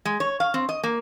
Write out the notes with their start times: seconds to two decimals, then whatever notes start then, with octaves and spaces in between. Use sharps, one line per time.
0.05 G#3
0.20 C#5
0.40 F5
0.54 C4
0.69 D#5
0.83 A#3